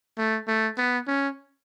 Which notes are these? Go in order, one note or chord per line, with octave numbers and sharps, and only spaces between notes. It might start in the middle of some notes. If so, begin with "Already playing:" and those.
A3
A3
B3
C#4